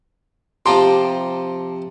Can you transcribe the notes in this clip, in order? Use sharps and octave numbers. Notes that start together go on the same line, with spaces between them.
C3 F3 G4 A5 A#5 C6